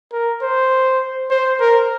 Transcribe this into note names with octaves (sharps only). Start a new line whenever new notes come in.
A#4
C5
C5
A#4